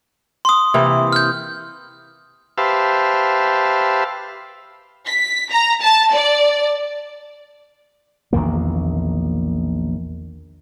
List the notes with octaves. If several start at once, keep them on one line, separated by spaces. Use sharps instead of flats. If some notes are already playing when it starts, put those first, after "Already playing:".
C6 D#6
C3 E3 A#3
F6 G6
G4 B4 C5 E5 F5 A5
B6
A#5
A5
D5
A#1 E2 D#3 A#3